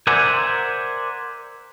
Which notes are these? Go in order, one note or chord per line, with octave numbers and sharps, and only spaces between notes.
A#4 C5 D5 E5 F#5 G#5